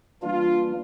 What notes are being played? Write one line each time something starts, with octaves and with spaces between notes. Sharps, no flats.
E3 G3 A#3 D4 F4